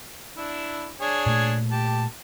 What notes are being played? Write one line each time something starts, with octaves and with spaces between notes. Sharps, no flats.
D4 E4
D4 G#4 C#5
A#2 A3
G4 A5